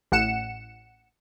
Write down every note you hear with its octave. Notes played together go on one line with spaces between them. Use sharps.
A1 A2 F#5 C#7 E7